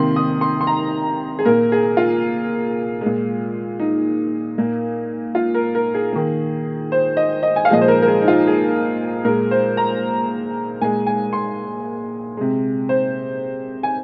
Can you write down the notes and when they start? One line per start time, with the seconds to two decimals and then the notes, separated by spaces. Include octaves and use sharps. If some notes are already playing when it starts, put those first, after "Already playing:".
Already playing: C3 D#3 A#3 C6
0.16 D#6
0.41 C6
0.61 C6
0.67 A#5
1.39 G#4
1.45 A#2 A#3 A#4
1.72 G#4
1.97 F4
3.01 G#3
3.06 A#2
3.80 D#4
4.58 A#2 A#3
5.35 F4
5.54 A#4
5.75 A#4
5.94 G#4
6.13 D#3 A#3
6.92 C5
7.17 D#5
7.43 D#5
7.56 G#5
7.65 F5
7.70 A#2 F3 G#3 D#5
7.81 C5
7.88 A#4
8.02 A#4
8.08 G#4
8.22 D#4
8.28 F4
8.47 G#4
9.25 A#2 G#3 A#4
9.51 C5
9.77 A#5
10.81 A#2 G#3 G#5
11.07 G#5
11.33 C6
12.37 C3 G#3
12.89 C5
13.83 G#5